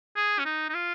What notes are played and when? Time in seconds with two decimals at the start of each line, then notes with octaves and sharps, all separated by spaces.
0.16 G#4
0.39 C#4
0.45 D#4
0.69 D#4
0.74 F4